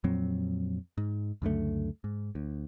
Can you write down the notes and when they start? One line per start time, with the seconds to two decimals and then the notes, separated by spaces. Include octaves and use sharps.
0.04 F2 A#2 F#3 C4
0.98 G#2
1.42 C#2 F#2 D3 A3
2.04 G#2
2.35 D2